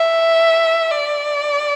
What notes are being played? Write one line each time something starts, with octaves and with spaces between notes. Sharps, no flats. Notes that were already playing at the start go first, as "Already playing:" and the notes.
Already playing: E5
D5